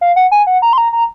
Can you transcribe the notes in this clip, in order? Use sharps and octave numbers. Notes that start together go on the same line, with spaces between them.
F5
F#5
G#5
F#5
A#5
C6
A#5
A#5